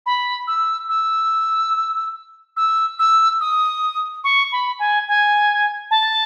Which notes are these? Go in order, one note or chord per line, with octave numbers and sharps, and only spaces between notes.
B5
E6
E6
E6
E6
D#6
C#6
B5
G#5
G#5
A5